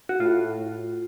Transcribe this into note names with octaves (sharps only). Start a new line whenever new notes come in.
F#4
A2 F4